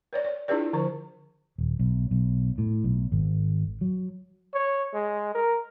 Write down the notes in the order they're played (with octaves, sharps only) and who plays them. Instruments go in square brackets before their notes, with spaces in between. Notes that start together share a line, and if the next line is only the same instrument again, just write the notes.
[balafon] B4 C#5 D5
D5
D4 E4 F4 G#4 B4 D5
D3 F3 C5
[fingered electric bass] D#1
B1
B1
A2
B1
G#1
F#3
[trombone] C#5
G#3
A#4